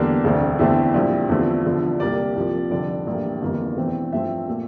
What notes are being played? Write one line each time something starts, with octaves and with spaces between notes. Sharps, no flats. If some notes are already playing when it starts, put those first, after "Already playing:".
Already playing: E2 D3 G3 A#3 D4
E1 D2 D3 A3 C4
E2 D3 A3 C4 E4
A#1 A#2 G3 C4
E2 D3 F3 A3 C4
E1 E2 D3 F3
C2 C3 G3 A#3 D5
C2 C3 F3 A#3
F1 F2 D3 G3 D5
A#1 A2 E3 G3 A#3
G1 F2 E3 A#3
E1 E2 E3 A3 C4
G2 F3 A3 C4 E5
A#2 A3